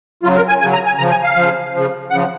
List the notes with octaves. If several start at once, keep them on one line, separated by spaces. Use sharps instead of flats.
C#3 F#3 F4
A#4
G#5
C#3 F#3 G#5
A#5
G#5
C#3 F3 A#5
G#5
F5
C#3 F3
C#3 F3
C#3 F3 F#5